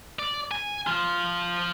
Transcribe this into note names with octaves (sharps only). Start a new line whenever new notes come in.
D5
G#5
F3 F4